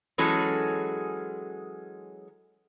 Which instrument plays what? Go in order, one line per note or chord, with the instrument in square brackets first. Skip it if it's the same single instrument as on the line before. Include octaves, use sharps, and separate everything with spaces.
[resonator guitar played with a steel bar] E3 F#3 G#3 C#4 G#4 A4